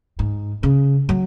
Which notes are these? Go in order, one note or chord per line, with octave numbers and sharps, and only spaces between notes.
G#2
C#3
F#3